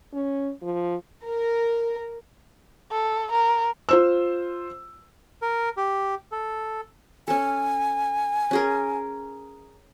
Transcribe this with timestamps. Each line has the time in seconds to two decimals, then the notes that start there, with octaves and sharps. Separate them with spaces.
0.14 C#4
0.62 F3
1.24 A#4
2.91 A4
3.32 A#4
3.89 F4 C5 E6
5.42 A#4
5.77 G4
6.32 A4
7.28 C#4 A4 G#5
8.51 C#4 G#4 A#4